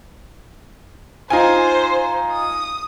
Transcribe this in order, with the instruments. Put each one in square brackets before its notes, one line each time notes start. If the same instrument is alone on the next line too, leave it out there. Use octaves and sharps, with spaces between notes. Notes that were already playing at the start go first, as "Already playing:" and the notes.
[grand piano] D#4 F4 G#5 [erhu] C5
[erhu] D#6